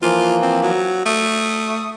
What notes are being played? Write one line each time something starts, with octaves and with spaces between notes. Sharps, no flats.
E3 F3 A#3 F4
C4
F#3
A3 D#6